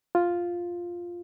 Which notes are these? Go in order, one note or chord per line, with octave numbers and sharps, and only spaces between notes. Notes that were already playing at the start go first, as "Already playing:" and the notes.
F4